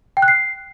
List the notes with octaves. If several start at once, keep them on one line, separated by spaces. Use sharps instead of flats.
G5
F#6
C7